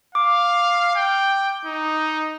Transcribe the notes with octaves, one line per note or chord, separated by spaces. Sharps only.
F5 D6
G5
D#4